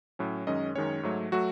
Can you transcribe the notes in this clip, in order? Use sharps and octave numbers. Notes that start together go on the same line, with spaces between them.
A2 F#3 C#4
F#2 D#3 G#3 C#4 D#5
F#2 D#3 G#3 C#4 C#5
G#2 F#3 A3
F#3 A3 F#4